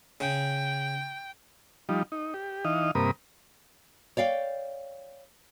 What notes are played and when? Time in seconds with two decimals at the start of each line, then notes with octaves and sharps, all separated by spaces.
0.20 C#3 G5
1.89 F3 G3 D#4
2.12 D#4
2.34 G4
2.65 E3 D#4 D#5 F5
2.95 G2 C3 A#3 A#4 B5 D#6
4.17 C#5 D5 F5 G5